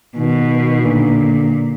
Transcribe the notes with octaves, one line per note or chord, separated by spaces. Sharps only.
B2 D#3
A#2 D3